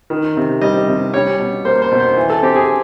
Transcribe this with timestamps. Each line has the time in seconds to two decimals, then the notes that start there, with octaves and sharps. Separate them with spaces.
0.10 D#3
0.37 C3
0.61 G3 D#5
0.88 C3
1.14 G3 C#5
1.39 B2
1.65 A#3 C5
1.82 C5
1.91 B2
2.00 C5
2.17 E3
2.30 A4
2.43 C4 G4
2.56 G#4